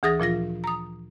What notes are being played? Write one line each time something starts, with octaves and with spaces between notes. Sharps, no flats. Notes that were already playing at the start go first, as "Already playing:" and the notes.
D2 E3 G#4 D#6 A6 A#6
A#2 F3 F4 A#6
A#5 D#6